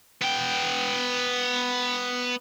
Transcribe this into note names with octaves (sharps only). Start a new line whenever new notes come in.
B3 G5